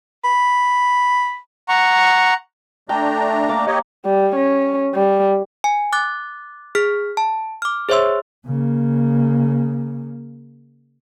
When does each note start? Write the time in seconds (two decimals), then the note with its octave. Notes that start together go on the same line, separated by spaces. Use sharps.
0.25 B5
1.69 F#5 A#5 C#6
2.89 A3 D4 G5 A#5
3.48 A#3 D6
3.66 G4 C#5 D#5
4.05 G3
4.35 C#4
4.94 G3
5.64 G#5
5.93 D6 F#6 A6
6.75 G#4 F6 B6
7.17 A5
7.62 D6 F6
7.89 G#4 C5 C#5 E5 C6 E6
8.46 C#3 A#3